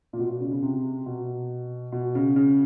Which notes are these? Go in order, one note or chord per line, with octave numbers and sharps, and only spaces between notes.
A#2
B2
B2
C#3
C#3
C3
B2
B2
C#3
C#3